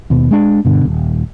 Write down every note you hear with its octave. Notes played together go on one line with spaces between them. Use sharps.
D#2 B2
G#3 D4
G2 B2 D3
D#1